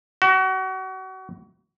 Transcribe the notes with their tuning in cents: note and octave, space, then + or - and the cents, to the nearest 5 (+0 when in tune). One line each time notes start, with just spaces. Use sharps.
F#4 +30